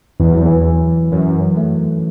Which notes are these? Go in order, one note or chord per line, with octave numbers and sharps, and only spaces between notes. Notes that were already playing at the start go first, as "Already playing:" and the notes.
E2 E3
F#3
E3
F#2 F#3
A3